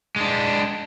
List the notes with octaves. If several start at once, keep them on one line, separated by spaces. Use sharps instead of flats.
G#3 D4